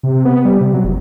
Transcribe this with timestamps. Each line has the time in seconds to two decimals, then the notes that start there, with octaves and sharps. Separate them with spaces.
0.03 C3
0.25 B3
0.45 G3
0.61 C3
0.74 F#3
0.85 F1